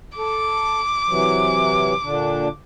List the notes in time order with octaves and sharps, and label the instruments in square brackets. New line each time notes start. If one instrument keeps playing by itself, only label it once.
[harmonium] A4 [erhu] D6
[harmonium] C3 E3 F#3
A#2 D3 D4